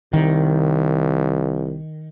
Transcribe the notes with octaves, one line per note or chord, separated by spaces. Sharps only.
C2 D#3